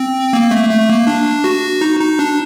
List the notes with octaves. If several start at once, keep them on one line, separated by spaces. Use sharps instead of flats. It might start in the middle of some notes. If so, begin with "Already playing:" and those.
Already playing: C4
A#3
A3
A3
A#3
D4
F#4
D#4
D#4
D4